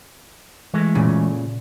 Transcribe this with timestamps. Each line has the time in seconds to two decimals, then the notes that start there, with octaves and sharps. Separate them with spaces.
0.74 E3 G#3 A3
0.95 A#2 C#3